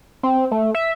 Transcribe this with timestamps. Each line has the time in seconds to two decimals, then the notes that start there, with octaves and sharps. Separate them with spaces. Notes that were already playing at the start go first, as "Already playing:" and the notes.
0.23 C4
0.51 A3
0.75 E5